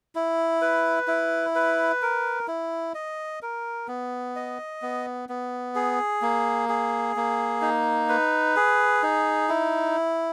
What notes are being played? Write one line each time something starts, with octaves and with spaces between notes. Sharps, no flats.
E4
B4
E4
B4
A#4
E4
D#5
A#4
B3
D#5
B3
B3
G#4
A#3
G#4
A#3
D#4
B4
G#4
D#4
E4